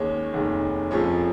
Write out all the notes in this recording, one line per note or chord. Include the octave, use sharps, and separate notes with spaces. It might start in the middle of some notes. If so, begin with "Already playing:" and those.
Already playing: D#2 D#3 G#3 C#4 C#5
F1 D#2 D#3 G#3
F1 F2 F3 G#3 C#4 C#5